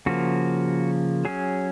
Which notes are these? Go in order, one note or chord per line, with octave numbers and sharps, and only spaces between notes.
C#3 F3 A#3 F#4
F#3 C#4 G#4